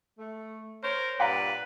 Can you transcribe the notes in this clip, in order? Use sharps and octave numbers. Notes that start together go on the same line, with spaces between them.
A3
A#4 C5 C#5
G2 A#2 B4 D5 F5 F#5 A#5